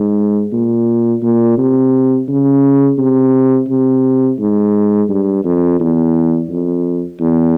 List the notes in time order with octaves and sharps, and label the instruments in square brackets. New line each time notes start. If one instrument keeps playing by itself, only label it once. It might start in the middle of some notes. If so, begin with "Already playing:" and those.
Already playing: [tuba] G#2
A#2
A#2
C3
C#3
C3
C3
G#2
G2
F2
E2
F2
E2